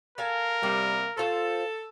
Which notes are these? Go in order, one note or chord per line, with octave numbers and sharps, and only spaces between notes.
A4 A#4 F5 G#5
C3 G3 A#3
F4 A4 C5